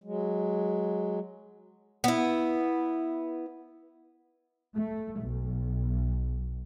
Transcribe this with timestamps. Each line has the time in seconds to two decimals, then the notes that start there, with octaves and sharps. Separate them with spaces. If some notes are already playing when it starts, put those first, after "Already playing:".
0.04 F#3 G#3
2.04 B3 E4
4.76 A3
5.21 B1